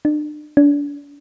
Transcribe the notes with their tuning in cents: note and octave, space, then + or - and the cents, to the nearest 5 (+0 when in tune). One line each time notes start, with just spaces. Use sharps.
D4 +40
D4 -30